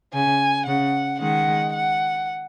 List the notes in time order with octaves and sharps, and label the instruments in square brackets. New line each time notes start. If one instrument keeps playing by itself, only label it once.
[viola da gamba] C#3 [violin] G#5
[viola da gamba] C#3 [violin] F#5
[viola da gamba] D#3 G#3 [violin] F#5
[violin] F#5